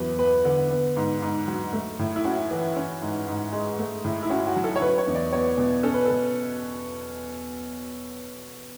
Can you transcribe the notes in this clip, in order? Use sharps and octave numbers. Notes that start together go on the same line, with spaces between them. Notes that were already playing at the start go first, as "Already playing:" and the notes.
Already playing: E2 F#3 B4
B3 B4
D3
B3
G#2
G#2
F#3
A3
A2
E4
C#4 F#4
E3
C#4
G#2
G#2
G#3
A3
A2
E4
C#4 F#4
F#4
F#3
A4
C#5
F#3 B4
C#5
E2
D5
B3 C#5
B2
C#4 A4
B4
B2 A4